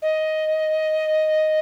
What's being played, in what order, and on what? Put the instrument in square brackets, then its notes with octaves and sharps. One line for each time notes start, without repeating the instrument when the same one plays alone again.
[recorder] D#5